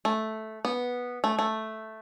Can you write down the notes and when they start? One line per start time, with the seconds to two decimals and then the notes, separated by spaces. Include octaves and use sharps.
0.05 A3
0.65 B3
1.24 A3
1.39 A3